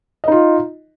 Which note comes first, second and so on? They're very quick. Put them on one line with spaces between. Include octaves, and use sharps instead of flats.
D#5 D#4 F4